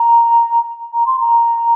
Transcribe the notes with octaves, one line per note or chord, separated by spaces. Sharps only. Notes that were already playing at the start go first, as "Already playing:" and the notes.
Already playing: A#5
A#5
C6
A#5